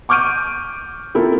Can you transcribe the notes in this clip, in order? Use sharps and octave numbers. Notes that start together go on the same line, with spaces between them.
C#6 D6 F6 G6 D7 D#7
A#3 C4 E4 F4 A4 A#4